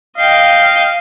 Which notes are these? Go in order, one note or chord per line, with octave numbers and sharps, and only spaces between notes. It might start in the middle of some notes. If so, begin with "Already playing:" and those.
D#5 F5 G5